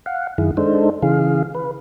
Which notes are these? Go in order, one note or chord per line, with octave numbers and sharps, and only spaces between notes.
F5 F#5
F#2 D#3 E4 G#4
G#3 D4 D#4 A4 C5
C#3 E3 G#4 F5
B4